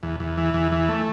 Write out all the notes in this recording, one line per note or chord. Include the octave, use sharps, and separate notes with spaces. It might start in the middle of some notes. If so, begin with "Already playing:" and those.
E2
E2
E3
E2
E3
A3